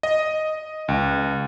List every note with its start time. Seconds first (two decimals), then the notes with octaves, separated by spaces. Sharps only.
0.03 D#5
0.88 C#2